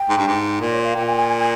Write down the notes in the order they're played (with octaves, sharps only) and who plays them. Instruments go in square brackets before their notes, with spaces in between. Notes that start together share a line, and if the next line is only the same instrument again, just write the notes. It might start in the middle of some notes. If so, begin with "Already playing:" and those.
Already playing: [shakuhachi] G5
[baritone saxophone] G#2
G2
G#2
A#2
[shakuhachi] C#5
F5
[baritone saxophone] A#2 [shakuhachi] G5
[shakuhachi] G#5
G#5
G#5
G#5